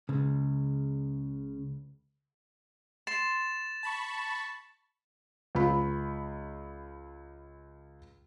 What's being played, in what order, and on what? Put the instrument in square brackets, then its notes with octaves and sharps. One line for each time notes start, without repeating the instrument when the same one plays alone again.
[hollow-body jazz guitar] C#2 [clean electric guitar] C#3
[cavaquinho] C6 [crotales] A6 E7
[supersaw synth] A5 B5 C#6
[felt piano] C#2 B5